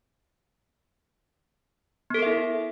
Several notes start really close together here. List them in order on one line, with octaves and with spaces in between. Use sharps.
B3 A4 A#4 E5 E4